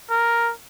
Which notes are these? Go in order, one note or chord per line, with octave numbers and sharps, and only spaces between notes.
A#4